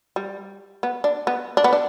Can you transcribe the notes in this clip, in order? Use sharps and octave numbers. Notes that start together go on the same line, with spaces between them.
G3
B3
D4
B3
D4
B3
D4